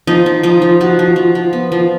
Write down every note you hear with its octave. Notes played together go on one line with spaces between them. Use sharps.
F3 D#4
F3
F3 D#4
F3
F3 F#4
F3
F3
F3
B3
F3